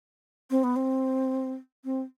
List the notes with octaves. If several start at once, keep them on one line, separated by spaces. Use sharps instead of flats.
C4
B3
C4
C4